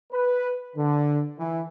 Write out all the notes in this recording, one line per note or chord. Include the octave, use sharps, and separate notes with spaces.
B4
D3
E3